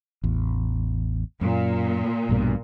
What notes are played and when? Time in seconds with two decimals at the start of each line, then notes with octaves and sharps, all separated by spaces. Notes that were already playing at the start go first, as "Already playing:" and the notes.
0.23 A1 E2
1.41 F#2 A#2
2.29 A#1 G2 B2